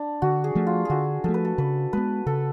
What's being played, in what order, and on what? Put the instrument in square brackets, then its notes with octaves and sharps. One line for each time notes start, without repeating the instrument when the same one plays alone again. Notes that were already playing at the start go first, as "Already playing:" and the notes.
Already playing: [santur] D4
[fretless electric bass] D3 [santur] F#4
[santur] G#4
[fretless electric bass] F3 A3
[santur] F4
[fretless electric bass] D3 [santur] F#4 G#4
[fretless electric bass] F3 A3 [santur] A4
[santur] B4
A4
[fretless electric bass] C#3 [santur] B4
[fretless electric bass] G#3 B3 [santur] B4
[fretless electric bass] C#3 [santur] A4